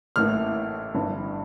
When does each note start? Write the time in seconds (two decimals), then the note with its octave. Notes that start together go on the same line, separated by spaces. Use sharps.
0.16 A1 A2 E3 A#3 F6
0.95 G1 G2 E3